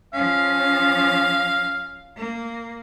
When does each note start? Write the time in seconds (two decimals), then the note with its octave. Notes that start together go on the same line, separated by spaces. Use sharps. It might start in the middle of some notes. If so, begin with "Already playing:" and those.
0.13 F3 C#4 F5
2.17 A#3